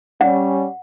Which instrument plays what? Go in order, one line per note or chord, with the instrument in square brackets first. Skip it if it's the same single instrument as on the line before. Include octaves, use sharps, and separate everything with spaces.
[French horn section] G3 C#4 [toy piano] F#5